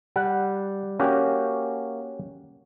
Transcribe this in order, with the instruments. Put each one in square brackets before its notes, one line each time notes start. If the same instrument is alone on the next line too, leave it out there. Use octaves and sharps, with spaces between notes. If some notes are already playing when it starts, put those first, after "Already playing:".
[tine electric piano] G3 [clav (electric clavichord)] F#5
[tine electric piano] A#3 [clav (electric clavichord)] C#4 F#4 G4